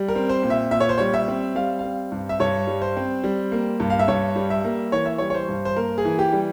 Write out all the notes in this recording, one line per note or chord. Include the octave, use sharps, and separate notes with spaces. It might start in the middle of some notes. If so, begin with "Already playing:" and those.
Already playing: G3
A#4
C4
C5
A#2
E5
A#2 E5
C#5
C5
G3 C#5
E5
C4
G3 F5
C4 F5
G2
E5
G2 C#5
G3
C5
C4
G3
A#3
G2
F5
E5
G2 C#5
G3
E5
A#3
E3 C#5
E5
G3 C#5
C#5
C5
G2
C5
A#3 A#4
G#4
E3
G4
G3